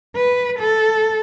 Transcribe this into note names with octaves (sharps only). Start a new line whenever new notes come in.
B4
A4